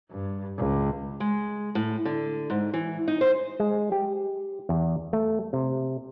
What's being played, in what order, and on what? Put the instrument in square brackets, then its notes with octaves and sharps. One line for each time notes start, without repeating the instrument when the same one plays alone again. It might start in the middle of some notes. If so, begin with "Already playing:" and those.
[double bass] G2
C#2
[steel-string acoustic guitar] G#3
A2
D3
G#2
E3
D#4
C5
[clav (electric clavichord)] G#3
G4
E2
A3
C3